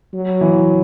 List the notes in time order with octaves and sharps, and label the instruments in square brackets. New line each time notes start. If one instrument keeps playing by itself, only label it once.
[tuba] F#3
[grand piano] E3